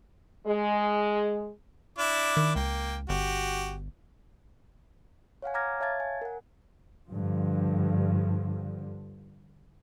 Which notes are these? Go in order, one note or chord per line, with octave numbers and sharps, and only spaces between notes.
G#3
D4 E4 D6
D#3
C#2 A#3 G5
G1 F#4 G4
C#5 F5 F#5 G#5
A#5 D6 F6 G#6 A#6
C#5 E5 F5 A5 G#6 A6
G#5
A#4 F#5
G2 D3 F3